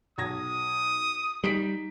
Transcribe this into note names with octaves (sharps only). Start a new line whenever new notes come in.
B1 D#6 G#6 A#6
G3 D#4 B6 D7